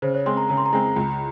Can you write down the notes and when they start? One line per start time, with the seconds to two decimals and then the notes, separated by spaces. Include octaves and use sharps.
0.02 C#3 C5
0.14 C#5
0.26 G#3 C4 C6
0.37 A#5
0.49 C#3 A#5
0.57 C6
0.66 A#5
0.73 G#3 C4
0.96 C#2